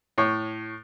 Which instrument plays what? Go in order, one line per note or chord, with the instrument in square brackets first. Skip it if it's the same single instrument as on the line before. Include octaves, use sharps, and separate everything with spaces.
[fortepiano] A2 C#5